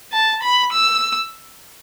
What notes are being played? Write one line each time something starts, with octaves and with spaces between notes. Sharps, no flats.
A5
B5
E6